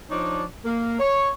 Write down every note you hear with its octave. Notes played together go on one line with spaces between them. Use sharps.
F3 D4 D#4 C#5 D5
A#3
C#5